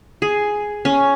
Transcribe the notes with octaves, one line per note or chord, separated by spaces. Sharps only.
G#4
C#4